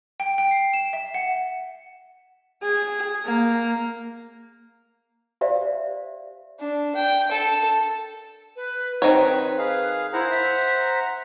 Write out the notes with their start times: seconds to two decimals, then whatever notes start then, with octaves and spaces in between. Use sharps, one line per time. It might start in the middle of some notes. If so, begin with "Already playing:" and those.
0.20 G5
0.38 G5
0.51 C7
0.73 E7
0.93 E5
1.15 F#5
2.63 G#4
3.25 A#3
5.41 G4 C5 D5 E5 F5
6.59 D4
6.95 G5
7.31 A4
8.56 B4
9.02 D#3 C4 B4 C#5
9.58 G#4 F5
10.13 E4 C5 F#5 A#5
10.30 E5